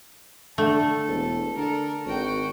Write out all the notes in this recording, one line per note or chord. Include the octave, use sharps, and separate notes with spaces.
D3 A3 A4
E1
D3 A4 A#4
G#1 F#4 G5